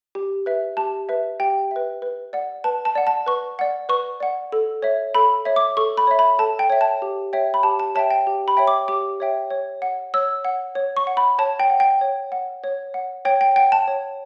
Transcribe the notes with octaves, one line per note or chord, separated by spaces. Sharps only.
G4
B4 E5
G4 A5
B4 E5
G4 G5
B4 E5
B4
D5 F#5
B4 A5
A5
D5 F#5
A5
B4 C#6
D5 F#5
B4 C#6
D5 F#5
A4
C#5 E5
A4 B5
C#5 E5
D6
A4 C#6
B5
C#5 E5
B5
A4 A5
G5
C#5 E5
A5
G4
C#5 E5 G5
B5
G4 A5
A5
C#5 E5 G5 A5
G5
G4
B5
C#5 E5 G5
D6
G4 D6
C#5 E5 G5
C#5
F#5
C#5 E6
F#5
C#5
C#6
F#5
B5
C#5 A5
G5
F#5
G5
C#5
F#5
C#5
F#5
C#5 G5
G5
F#5 G5
A5
C#5